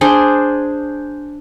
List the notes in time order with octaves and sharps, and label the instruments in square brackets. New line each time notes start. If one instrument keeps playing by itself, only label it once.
[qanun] D4 G#4 C5 C6